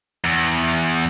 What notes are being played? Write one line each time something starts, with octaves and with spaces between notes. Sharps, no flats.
E2